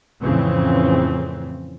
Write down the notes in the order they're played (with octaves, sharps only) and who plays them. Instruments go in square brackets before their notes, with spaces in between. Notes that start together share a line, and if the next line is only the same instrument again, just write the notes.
[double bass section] F2 A2 C#3 E3 C4